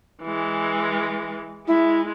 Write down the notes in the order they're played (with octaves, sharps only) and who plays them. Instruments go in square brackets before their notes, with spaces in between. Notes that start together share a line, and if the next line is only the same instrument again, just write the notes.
[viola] E3 G#3
[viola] G#3 [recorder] E4